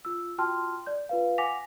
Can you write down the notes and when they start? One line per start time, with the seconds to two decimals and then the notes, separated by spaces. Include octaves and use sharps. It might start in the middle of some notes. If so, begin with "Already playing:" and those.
0.05 F4 E6
0.38 F4 F#4 G5 A5 C6 F6
0.87 D5 G6
1.09 F4 B4 F5
1.38 F#5 G#5 D6 A#6 B6 F7